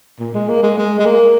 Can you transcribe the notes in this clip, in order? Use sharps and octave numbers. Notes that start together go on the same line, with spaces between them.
A#2
G#3
A#3
G#3
G#3
G#3
A#3